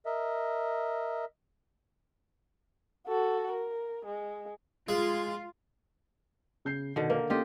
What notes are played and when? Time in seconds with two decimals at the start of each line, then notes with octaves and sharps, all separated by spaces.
0.06 A#4 D#5 E5
3.07 F#4 A4
3.52 A#4
4.06 G#3
4.89 G#3 F4
6.65 C#3 G6 C7
6.96 B2 D3 D#3
7.10 A#3 A#4
7.30 A#3 C#4 F4 G4 A4 D#5